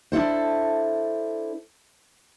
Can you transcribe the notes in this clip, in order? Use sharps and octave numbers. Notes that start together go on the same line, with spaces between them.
D4 E4 A4 C5